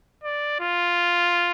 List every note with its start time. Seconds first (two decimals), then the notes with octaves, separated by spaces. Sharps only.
0.24 D5
0.60 F4